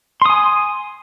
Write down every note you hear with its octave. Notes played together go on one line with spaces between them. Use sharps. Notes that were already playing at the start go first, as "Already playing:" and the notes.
G#5 C6 D#6